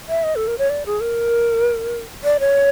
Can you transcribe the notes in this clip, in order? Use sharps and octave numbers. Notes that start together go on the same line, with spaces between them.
E5
D#5
A4
A#4
C#5
D5
G#4
A#4
D5
C#5